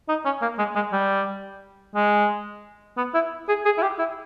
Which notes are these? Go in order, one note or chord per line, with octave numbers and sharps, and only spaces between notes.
D#4
C#4
A#3
G#3
G#3
G3
G#3
B3
E4
G#4
G#4
E4
G4
E4